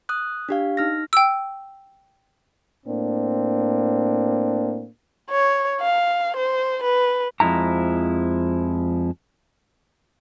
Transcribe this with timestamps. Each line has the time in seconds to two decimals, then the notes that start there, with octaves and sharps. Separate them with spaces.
0.09 D#6 F#6
0.49 D4 G4 F5
0.77 D#4 F6 A#6
1.13 G5 E6
2.86 A2 A#3 C4 D4
5.30 C#5
5.81 F5
6.36 C5
6.83 B4
7.40 F2 F3 G#3 E4 A#5